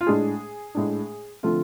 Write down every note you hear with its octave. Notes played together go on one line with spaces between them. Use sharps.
F4
A2 G#3 D4 G#4
A2 G#3 D4
D3 F3 A3 C4 F4